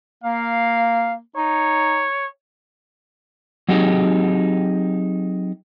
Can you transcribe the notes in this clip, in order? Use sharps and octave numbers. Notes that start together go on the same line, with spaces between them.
A#3 F5
D#4 C#5
F#3 C4 D#4 G4 G#4